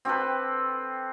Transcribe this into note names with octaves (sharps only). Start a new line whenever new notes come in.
C4 G4 A4 B4